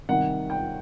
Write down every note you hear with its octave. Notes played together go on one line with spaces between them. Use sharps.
C3 D#3 G3 F#5
G5